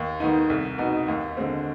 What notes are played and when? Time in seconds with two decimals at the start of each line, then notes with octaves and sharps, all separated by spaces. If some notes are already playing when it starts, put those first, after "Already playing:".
Already playing: D#2
0.20 D#3 B3 D#4
0.50 C2
0.78 B2 B3 D#4
1.08 D#2
1.37 D3 G#3 C4